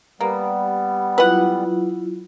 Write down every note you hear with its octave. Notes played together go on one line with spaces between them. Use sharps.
G3 A#3 B3 G4
F#3 E4 F4 B4 F#5